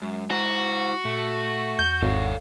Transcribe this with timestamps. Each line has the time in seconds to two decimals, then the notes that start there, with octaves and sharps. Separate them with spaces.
0.02 F#2 G#3
0.30 E4 F#4 C5 A#5
1.05 A#2 A3
1.79 E2 G6
2.02 G#1 A4 C#5 F5